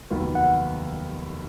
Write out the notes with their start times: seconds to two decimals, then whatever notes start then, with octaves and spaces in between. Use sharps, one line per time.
0.10 F1 D#2 D#3 F#3 B3
0.35 F#5